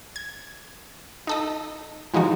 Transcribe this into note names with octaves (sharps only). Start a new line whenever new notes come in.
G#6
D#4 A4 D#5
E3 F3 G#3 D#4 F#4